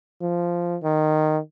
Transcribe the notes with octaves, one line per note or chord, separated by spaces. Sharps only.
F3
D#3